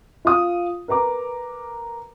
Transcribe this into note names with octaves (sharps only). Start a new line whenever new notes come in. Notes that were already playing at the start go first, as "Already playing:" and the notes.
F4 F5 D#6
A#4 B4 A#5 D6